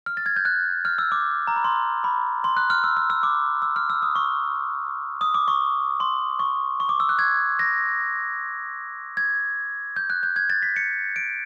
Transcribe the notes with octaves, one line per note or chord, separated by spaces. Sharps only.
F6
A6
G#6
G6
F#6
F6
E6
D6
A#5
B5
C6
B5
C6
F#6
F6
E6
E6
E6
D6
E6
F6
E6
D#6
C#6
D#6
D6
C#6
C6
C#6
C#6
D6
E6
F#6
G#6
A#6
G#6
G6
F#6
G6
G#6
A6
B6
C#7
D7